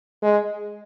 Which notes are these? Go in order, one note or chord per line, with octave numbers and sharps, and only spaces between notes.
G#3